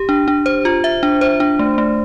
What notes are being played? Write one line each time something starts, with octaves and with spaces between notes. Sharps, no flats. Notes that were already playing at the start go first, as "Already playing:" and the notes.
Already playing: G4
D4
D4
C5
F4
E5
D4
C5
D4
A3
A3